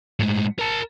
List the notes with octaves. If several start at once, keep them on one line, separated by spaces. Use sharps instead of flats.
A2 G#3
A#4 A5